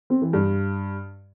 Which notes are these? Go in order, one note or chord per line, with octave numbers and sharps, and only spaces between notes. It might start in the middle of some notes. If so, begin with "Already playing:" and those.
C4
E3
G2